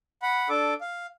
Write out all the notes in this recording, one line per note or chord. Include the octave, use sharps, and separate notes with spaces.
F#5 B5
D4 A4 D6
F5